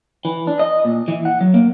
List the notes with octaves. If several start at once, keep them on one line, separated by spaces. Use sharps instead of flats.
E3
D4
D#5
A#2
E3
F#5
F#3
A#3